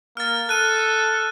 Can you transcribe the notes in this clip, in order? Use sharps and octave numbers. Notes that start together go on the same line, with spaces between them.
A#3 F6 A6
A4 F#6 D#7